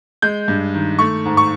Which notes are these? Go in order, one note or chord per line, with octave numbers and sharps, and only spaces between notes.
G#3 G6
G2
D#3
A3 C#6
G#2
C#6